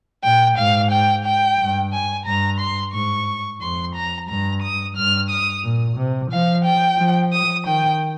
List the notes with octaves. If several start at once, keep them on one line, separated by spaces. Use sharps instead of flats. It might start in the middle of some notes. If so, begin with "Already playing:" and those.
A#2 G5
G#2 F5
G5
G5
G2
G#5
G2 A#5
C6
G#2 C#6
F2 C6
A#5
G2 A#5
D#6
G2 F6
D#6
A#2
C3
F3 F5
G5
F3
D#6
D#3 G5